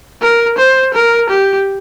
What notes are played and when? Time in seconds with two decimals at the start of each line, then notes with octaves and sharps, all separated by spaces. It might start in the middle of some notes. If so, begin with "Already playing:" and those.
0.21 A#4
0.58 C5
0.94 A#4
1.30 G4